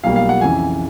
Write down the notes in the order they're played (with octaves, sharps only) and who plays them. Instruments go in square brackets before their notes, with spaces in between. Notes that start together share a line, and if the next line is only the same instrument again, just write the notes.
[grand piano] B1 B2 G3 A#3 F5
F5
F#5
F2 C#3 E3 G#5